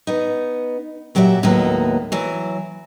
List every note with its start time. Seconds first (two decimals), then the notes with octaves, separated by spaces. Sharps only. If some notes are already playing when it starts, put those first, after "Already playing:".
0.07 B3 D#4
1.15 A#2 F#3 F#4 G4 C5 E5
1.43 D#2 A2 F#3 G#3 A#3 B3
2.12 E3 F#3